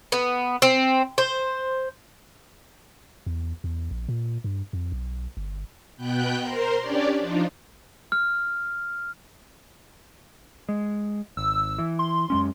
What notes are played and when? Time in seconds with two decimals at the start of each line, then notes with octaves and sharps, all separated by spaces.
0.12 B3
0.62 C4
1.18 C5
3.27 E2
3.64 E2
3.91 A#1
4.08 A#2
4.44 G2
4.73 F2
4.92 B1
5.37 G1
5.97 B2 B3 G5 F#6 G6
6.40 A#4 C5 A#5 C6
6.80 C#4 D4 G4 C#5 D5
7.19 F3 D4 D#4 F4
8.12 F6
10.69 G#3
11.37 G#1 E6
11.78 E3
11.99 C6
12.30 F#2 G#3 C#4